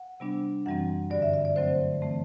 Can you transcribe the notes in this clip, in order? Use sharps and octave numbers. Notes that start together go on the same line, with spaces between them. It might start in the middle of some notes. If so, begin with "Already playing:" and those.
Already playing: F#5
C3 G3 B3 D4
F#2 E3 G3 C4 F#5
G2 D3 G3 D5
E5
E5
D5
D3 F#3 A3 C4 C5
E3 A3 C4